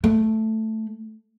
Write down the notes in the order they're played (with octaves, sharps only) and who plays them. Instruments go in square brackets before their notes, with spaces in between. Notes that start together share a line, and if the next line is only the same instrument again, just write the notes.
[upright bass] A3